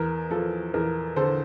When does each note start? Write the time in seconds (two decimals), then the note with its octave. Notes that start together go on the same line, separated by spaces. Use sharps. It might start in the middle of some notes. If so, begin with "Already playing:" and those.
Already playing: E2 A#4
0.31 F3 A4
0.74 E2 A#4
1.16 D3 A4 C5